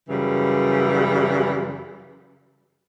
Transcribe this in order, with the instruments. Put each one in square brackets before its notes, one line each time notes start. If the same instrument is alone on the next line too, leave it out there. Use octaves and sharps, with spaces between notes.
[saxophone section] F#2 C#3 E3 G3